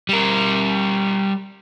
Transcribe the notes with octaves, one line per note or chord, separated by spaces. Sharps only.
G3 A#4